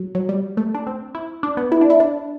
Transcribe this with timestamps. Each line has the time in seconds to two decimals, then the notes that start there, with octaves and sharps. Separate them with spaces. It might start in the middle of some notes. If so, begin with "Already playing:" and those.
Already playing: F#3
0.15 F#3
0.29 G3
0.57 A3
0.75 D4
0.87 C4
1.15 E4
1.43 D4
1.57 B3
1.72 E4
1.81 D4
1.90 E4
2.00 D4